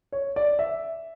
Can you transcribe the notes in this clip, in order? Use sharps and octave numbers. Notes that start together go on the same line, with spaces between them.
C#5
D5
E5